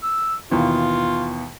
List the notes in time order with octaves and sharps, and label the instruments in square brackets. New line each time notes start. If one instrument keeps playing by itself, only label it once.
[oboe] E6
[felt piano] D#2 B2 E3 [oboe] F4